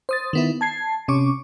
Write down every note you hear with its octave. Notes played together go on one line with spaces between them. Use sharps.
C5 D#6 A6
D#3 B3 E4
A5 G#6 C7
C3 C#4 C#6 D6